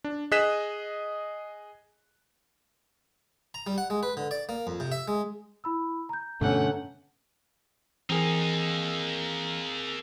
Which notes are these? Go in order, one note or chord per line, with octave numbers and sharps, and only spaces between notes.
D4
G#4 D#5 F#6 B6 E7
A#5
G3
F#5
G#3
B4
D3
D5
A#3
F2
C3
E5
G#3
E4 B5 E6
A#5 G6
G2 B2 D3 A3 C#4 F#5
E3 A#3 C4 D#4 G#4 A#4